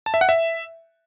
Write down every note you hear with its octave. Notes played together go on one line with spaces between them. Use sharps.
A5
E5
F#5
E5